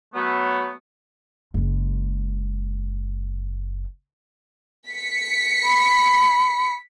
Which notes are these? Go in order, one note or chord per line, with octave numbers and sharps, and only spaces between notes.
F#3 A3 B3
F#1 G#3
B6 C#7
B5